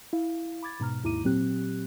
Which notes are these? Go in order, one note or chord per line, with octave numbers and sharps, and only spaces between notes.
E4 F5
B5 D6 G#6 A6
G#2 B2 A#5 F6
D#2 G#2 E4 A#5 D6 D#7
A#2 F#3 C4 G4 F#6